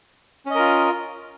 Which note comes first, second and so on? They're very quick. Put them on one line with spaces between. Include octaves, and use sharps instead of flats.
C#4 D#5 A#4 F4